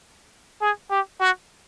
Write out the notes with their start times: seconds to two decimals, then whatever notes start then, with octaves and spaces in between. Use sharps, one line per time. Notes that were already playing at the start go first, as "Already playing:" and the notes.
0.62 G#4
0.91 G4
1.20 F#4